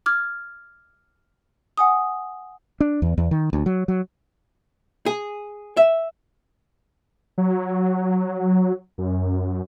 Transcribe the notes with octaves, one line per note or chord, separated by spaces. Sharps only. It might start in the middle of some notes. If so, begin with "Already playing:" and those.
D6 F6 G#6
F#5 G#5 D#6
D4
E2
E2
D#3
D2
F#3
F#3
G#4
E5
F#3
F#2